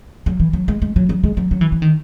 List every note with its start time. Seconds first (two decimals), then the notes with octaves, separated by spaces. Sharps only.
0.26 F#3
0.40 E3
0.53 F#3
0.68 G#3
0.82 G#3
0.96 F#3
1.09 F#3
1.24 G#3
1.37 F#3
1.51 F#3
1.61 E3
1.72 E3
1.82 D#3